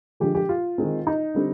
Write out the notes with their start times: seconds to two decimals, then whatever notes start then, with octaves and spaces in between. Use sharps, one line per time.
0.20 D3 F3 G#3 G4
0.35 G4
0.49 F4
0.78 D#3 G#3 C4
1.07 D#4
1.34 D3 G3 C4